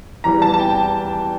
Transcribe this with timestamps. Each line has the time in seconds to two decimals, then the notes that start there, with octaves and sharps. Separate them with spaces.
0.24 E2 E3 G3 A#5
0.42 A5
0.53 A5
0.60 G5